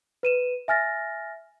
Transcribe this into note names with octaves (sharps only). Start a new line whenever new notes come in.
B4 D#7 E7
E5 G#5 F6 A6 A#6